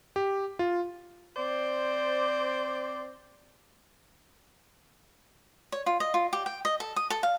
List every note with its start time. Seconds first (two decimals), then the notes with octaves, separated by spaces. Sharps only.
0.16 G4
0.59 F4
1.36 C4 C5 D5
5.72 C#5
5.86 F4
6.00 D#5
6.14 F4
6.33 G4
6.46 G5
6.65 D#5
6.80 A4
6.96 D#6
7.10 A4
7.23 F5